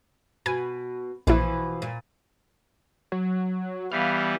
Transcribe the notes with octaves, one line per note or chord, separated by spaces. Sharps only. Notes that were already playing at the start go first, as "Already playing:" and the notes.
B2 G#5
A#1 B2 E3 F3 E4
A#2
F#3
E3 G3 B3 F5